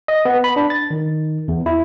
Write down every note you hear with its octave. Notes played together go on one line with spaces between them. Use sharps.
D#5
B3
B5
D4
A6
D#3
E2
E4